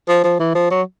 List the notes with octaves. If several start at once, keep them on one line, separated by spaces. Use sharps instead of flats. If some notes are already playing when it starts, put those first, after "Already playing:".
F3
F3
E3
F3
F#3